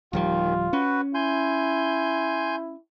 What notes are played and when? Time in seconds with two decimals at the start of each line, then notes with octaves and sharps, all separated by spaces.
0.13 D1 D#2 D#3 F3 G3 F4
0.73 C#4 F#4 B4
1.14 E4 G#5 C6 G6